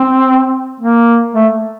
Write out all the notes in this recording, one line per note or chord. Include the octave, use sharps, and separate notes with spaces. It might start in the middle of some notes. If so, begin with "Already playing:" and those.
Already playing: C4
A#3
A3